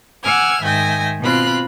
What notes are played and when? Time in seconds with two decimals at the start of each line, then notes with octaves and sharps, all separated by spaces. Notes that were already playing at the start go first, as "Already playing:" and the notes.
0.24 F#5 G#5 D6 E6 F6 G#6
0.63 G#2 D#3 E5 G5 G#5 A#6
1.21 B2 C4 F4 B5 F#6